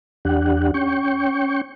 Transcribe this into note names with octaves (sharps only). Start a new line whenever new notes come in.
E2 D4 G4 F#5
C#4 G5 C#6